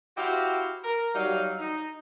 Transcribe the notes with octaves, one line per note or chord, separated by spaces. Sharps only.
E4 F#4 G4 C5 F5
A#4
F#3 G3 D#4 F5
D#4